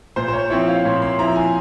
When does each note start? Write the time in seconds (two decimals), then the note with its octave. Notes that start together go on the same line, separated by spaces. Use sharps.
0.16 A#2 C5
0.28 C5
0.33 C#5
0.50 F3 C4 E4 C#5
0.68 F5
0.85 A#2 C#5
1.02 C6
1.19 F3 C4 E4 A#5
1.36 G#5